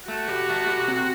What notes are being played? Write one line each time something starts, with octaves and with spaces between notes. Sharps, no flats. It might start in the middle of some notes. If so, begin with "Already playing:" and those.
A3 F#4
G4
A3
G4
C4